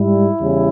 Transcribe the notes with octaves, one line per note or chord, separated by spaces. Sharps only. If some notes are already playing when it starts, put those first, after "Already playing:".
Already playing: G#2 G3 E4
E2 C#3 G3